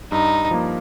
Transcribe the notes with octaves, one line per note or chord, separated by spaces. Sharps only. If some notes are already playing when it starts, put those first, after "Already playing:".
G2 D#4
F3 A#3